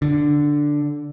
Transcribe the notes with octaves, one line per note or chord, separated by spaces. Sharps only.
D3